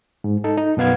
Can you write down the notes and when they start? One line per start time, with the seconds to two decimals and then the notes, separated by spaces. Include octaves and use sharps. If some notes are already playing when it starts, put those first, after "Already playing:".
0.24 G#2
0.44 D#4 A4
0.58 D#4
0.77 F#2 B2 B3 F5 G#6